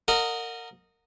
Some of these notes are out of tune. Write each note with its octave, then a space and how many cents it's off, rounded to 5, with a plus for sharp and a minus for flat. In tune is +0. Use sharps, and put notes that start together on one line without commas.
A#4 -25 D#5 +0 F#5 -30